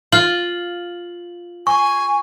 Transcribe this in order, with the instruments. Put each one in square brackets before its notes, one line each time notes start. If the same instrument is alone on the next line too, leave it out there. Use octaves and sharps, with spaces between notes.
[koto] F4 [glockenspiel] F#7
[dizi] G#5 [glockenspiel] C#6